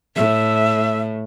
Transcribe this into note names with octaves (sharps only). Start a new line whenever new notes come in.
A2 E5